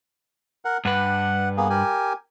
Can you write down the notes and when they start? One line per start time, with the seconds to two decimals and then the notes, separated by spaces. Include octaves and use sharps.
0.65 A#4 F#5
0.85 G2 B4 F#5
1.57 A#3 B3 G#4
1.70 G4 A#4 G#5